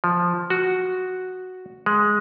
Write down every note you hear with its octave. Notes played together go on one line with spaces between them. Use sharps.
F3
F#4
G#3